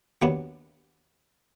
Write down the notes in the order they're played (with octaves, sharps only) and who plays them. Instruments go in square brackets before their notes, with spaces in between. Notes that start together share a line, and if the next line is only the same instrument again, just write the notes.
[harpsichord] D#2 D#3 F#3 B3 D4